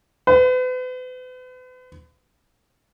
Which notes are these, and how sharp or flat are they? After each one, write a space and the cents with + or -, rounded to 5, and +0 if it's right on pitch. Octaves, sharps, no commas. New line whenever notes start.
B4 +40